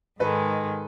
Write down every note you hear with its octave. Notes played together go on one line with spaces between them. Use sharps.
G#2 D#3 G#3 A4 B4